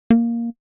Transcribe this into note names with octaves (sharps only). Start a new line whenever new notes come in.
A#3